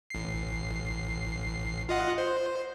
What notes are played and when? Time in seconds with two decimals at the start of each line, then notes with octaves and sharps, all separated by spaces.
0.10 A1 C7
1.89 F4 D#5 F#5
2.18 C5